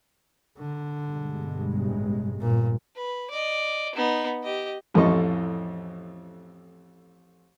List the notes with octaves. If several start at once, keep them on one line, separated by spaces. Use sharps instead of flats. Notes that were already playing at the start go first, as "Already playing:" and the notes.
D3
G2 B2 G#3
A1
G1 A#2
B4
D5 D#5
B3 D#4
G4 D#5
A1 F2 E3 A4 D#5 C#6